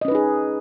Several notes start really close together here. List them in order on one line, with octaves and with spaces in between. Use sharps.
D#5 C#4 B4 D#4 G#4